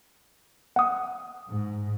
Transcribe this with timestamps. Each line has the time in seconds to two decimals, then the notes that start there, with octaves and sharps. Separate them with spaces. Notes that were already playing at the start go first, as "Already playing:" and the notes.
0.76 F#5 D#6
1.48 G#2